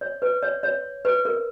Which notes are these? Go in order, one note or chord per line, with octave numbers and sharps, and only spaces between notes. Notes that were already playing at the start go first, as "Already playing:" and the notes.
C#5
B4
C#5
C#5
B4
A#4